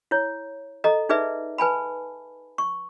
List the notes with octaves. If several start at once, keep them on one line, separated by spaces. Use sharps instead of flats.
E4 C#5
A4 D#5 A#5
D#4 G#4 B4 D5 E5
B4 G#5 A5 B5
C#6